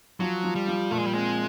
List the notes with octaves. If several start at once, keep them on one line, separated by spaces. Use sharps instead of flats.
F3 F#3
F3
G3
F3
A#2 A3
G#3
G3
G#3 C4